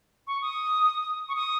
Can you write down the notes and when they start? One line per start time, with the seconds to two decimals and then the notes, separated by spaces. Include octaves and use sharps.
0.27 C#6
0.42 D#6
1.29 C#6
1.36 D#6